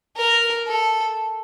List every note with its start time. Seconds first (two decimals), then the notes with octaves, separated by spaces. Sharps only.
0.16 A#4
0.67 A4